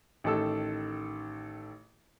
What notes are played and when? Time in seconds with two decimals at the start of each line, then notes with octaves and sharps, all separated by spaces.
0.24 A1 D#3 A4 E6